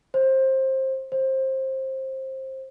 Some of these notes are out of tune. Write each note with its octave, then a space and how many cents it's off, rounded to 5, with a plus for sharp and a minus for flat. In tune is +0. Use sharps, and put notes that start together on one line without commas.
C5 +20
C5 +20